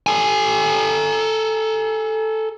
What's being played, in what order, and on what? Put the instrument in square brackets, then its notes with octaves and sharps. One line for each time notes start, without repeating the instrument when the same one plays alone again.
[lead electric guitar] A4 G#5